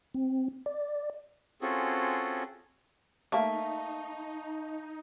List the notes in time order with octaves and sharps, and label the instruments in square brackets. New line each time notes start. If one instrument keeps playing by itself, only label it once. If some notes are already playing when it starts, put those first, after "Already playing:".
[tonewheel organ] C4
D5
[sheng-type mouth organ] C4 C#4 F4 F#4 G#4 A4
[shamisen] A3 A#3 [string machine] D#4 [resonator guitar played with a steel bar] E5 [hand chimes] F5 A5 C#6